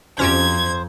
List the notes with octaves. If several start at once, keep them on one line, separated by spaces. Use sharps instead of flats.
F2 C#4 F#4 G4 C5 G#6